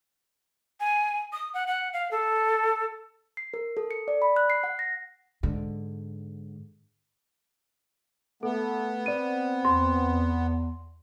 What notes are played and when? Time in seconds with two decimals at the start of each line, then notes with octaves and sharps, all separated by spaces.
0.80 G#5
1.33 D#6
1.54 F#5
1.67 F#5
1.93 F5
2.11 A4
3.37 C7
3.54 A#4
3.77 A4
3.91 C#7
4.08 D5
4.22 B5
4.36 F#6
4.50 C7
4.64 F#5
4.79 A#6
5.43 G#2 D3
8.43 A3 B3 A4
9.06 C4 D5 D#7
9.65 E2 C6